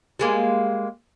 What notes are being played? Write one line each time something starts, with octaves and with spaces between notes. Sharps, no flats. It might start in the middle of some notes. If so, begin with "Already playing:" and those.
G3 G#3 A#3